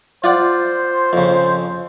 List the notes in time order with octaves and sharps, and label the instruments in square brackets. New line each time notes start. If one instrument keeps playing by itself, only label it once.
[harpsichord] F4 D5 F#5 [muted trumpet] C5
[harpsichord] F2 C#3